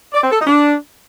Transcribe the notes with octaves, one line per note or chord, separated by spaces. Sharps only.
D5
C4
A4
D#4
D4